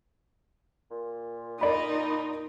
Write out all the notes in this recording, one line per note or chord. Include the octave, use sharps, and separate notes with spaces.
A#2
D#4 A#4 D5 B5